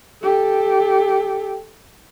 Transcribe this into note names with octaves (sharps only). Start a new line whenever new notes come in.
G4 A4